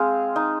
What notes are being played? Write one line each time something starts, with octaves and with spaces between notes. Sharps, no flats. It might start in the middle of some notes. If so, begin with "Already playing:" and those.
Already playing: G#3 C4 F5
D#4